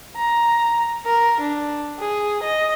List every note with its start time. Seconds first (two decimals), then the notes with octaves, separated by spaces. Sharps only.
0.16 A#5
1.06 A#4
1.40 D4
1.99 G#4
2.43 D#5